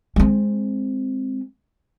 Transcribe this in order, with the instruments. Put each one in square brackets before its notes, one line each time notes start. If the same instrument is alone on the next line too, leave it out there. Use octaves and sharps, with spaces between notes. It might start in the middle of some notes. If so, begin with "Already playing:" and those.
[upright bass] G#3 C4